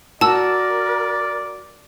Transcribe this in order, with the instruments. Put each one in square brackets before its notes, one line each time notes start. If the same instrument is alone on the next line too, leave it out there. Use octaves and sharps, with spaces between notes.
[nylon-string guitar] F#4 [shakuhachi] A#4 [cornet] D5 [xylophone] A5 E6